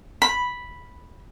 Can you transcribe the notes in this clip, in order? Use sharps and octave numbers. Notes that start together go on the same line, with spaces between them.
B5